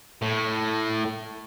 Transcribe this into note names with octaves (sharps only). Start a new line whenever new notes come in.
A2